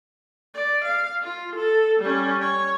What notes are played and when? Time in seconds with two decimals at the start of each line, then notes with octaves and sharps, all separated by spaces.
0.54 D5
0.85 F5
1.22 F4
1.56 A4
2.01 G3 C#4
2.42 C#5